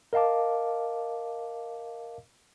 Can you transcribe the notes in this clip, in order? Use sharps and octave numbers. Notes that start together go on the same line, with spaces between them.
A#4 D#5 F5 A5 D6